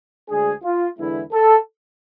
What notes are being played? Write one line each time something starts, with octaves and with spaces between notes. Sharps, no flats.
D2 D3 G#3 D4 G#4
F4
E2 D3 G#3 B3 E4
A4